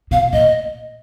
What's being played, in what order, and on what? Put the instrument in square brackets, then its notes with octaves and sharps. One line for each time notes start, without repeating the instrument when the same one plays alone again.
[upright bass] B2 [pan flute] F5
[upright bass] A#2 [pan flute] D#5